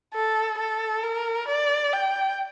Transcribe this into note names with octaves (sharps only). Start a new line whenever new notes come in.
A4
A4
A#4
D5
G5